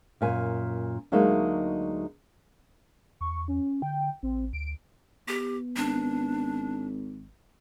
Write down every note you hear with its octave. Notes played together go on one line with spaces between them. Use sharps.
F#2 A#2 G#5
D2 F#3 G#3 A#3 D#4 E5
E2 C#6
C#4
D3 G5
A1 C4
D2 D7
B3 G4
G#1 D4